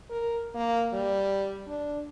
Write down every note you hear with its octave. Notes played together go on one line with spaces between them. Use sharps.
A#4
A#3
G3
D4